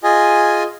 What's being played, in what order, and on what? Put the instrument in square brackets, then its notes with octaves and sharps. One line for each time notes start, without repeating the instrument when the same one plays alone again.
[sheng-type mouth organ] F4 G#4 D#5 G#5